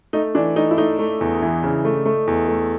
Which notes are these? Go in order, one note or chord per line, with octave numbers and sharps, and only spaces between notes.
A3 D#4
E3 D4
A3 D#4
E4
A3 D#4
A3
E2
E3
C#3
A3
A3
E2
A3